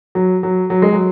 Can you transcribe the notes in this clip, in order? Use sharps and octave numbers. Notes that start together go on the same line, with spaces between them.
F#3
F#3
F#3
G#3
F#3